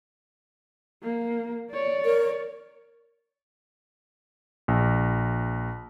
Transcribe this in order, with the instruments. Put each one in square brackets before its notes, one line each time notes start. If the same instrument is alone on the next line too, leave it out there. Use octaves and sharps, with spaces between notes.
[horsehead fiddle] A#3
C#5 D5
[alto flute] A#4
[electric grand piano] A#1